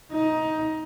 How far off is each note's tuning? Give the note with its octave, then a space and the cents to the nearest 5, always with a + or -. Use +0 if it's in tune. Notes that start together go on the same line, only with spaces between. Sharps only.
D#4 +15